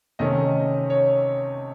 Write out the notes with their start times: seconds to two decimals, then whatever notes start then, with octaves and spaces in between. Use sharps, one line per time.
0.19 C3 D#3 A3 C#4 D#5
0.90 C#5